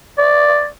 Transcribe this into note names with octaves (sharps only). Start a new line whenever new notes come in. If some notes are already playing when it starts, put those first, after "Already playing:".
D5